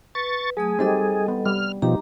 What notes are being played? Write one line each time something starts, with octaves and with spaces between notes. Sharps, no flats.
B4 C#6 A6
F#3 A3 G#4 D#6
G3 C4 D#4 G4 A4 D#5
B3
G3 F6
B2 F3 D#4 G4 A#5